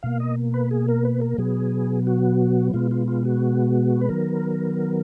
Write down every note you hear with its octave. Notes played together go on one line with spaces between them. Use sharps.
B2 A#3 F5
D#5
B4
G#4
A#4
B4
A#4
B2 F#3 B3 G#4
F#4
B2 G#3 B3 F4
F4
F4
F#4
B4
D#3 F#3 B3 A#4